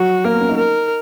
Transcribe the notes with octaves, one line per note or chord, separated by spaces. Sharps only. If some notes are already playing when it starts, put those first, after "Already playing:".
Already playing: F#3 F#4
A#3 A#4
B3
C#4
D#4
A#4